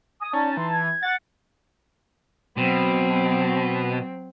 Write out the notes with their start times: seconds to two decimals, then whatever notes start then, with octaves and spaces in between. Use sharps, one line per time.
0.21 G#5 D#6
0.33 C#4 D#4 D5 A5
0.57 E3 C6
0.72 G#6
1.03 F#5 A6
2.57 B2 F#3 C4